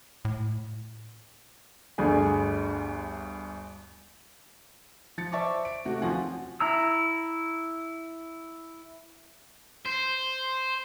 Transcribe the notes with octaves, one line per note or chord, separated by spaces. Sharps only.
A2
G1 D2 G#4
F3 A6 C#7
C5 D5 E5 A5 C#6 D6
D7
C3 A3 F#4
D#2 F3 C#4 F4 F#5 G#5
E4 A#5 E6
C5